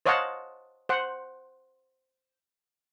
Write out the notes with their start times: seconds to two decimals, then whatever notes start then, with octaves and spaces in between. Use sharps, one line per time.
0.06 C5 C#5 D#5 F5 F#5 A5
0.89 C5 F#5